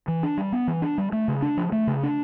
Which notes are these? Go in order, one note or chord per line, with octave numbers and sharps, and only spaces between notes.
E3
D4
G3
B3
E3
D4
G3
A3
C#3
D4
F3
A3
C#3
D4